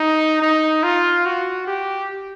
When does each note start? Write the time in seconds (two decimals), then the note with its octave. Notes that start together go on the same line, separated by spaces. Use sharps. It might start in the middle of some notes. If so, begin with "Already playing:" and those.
Already playing: D#4
0.42 D#4
0.83 F4
1.26 F#4
1.67 G4